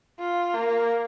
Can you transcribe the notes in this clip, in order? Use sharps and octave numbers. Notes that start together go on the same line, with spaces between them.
F4
A#3